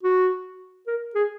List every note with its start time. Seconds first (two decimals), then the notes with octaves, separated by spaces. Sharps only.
0.03 F#4
0.87 A#4
1.15 G#4